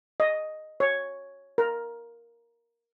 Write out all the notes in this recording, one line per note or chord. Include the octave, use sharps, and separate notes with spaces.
D#5
C#5
A#4